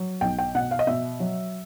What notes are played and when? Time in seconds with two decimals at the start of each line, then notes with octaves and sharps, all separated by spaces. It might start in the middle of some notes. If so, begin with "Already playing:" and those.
Already playing: F#3
0.21 B1 G5
0.39 G5
0.55 B2 F#5
0.71 F5
0.79 D#5
0.87 B2 E5
1.20 F#3